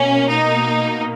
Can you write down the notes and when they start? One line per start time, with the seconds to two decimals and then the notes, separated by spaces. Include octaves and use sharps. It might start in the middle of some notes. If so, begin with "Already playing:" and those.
Already playing: B2 A#3 C#4
0.29 D#4